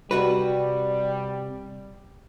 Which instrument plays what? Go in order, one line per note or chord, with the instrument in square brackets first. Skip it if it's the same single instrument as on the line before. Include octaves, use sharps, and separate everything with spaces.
[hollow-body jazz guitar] C3 F#4 B4 [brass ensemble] G3